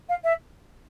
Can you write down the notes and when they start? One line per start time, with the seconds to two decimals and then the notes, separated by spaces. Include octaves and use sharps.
0.09 F5
0.24 E5